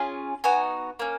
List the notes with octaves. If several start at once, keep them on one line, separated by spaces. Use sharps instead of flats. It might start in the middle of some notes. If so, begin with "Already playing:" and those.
Already playing: C#4 F4 G#4
B3 D#4 F#4 G#5
A#3 C#4